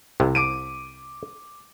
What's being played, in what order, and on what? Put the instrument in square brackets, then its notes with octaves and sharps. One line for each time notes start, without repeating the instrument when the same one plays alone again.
[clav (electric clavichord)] C2 C3
[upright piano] D6 D7 D#7